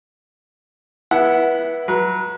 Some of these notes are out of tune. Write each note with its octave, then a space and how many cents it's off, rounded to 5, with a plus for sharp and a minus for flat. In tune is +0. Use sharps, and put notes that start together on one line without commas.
B3 -20 E4 +0 F#5 +0
F#3 +0 B4 -30